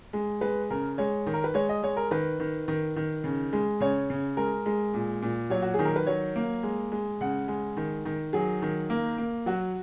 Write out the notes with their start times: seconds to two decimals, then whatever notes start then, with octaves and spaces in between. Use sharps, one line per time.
0.13 G#3
0.41 G#3 B4
0.70 C#3 A#4
0.98 G#3 C#5
1.27 D#3
1.34 A#4
1.44 B4
1.54 G#3 C#5
1.69 D#5
1.83 G#3 C#5
1.97 A#4
2.11 D#3 B4
2.40 D#3
2.68 D#3
2.96 D#3
3.24 C#3
3.53 G#3
3.80 C#3 C#5
4.10 C#3
4.37 G#3 A#4
4.66 G#3
4.94 A#2
5.22 A#2
5.50 F#3 C#5
5.62 F#4
5.74 D#3 G#4
5.85 A#4
5.96 B4
6.07 F#3 C#5
6.36 A#3
6.63 G#3
6.92 G#3
7.21 C#3 F#5
7.48 G#3
7.77 D#3
8.05 D#3
8.33 F#3 G#4
8.62 D#3
8.90 A#3
9.18 A#3
9.46 F#3 F#4